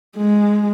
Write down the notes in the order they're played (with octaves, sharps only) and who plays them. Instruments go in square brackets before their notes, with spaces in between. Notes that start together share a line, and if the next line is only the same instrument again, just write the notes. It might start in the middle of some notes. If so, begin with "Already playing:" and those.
[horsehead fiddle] G#3